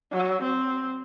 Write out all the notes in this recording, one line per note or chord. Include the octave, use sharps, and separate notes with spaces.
F#3
C4